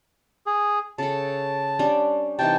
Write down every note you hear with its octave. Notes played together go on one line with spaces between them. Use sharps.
G#4
C#3 A4 A5
G3 C#4 D4
C3 E3 D#4 G5 A5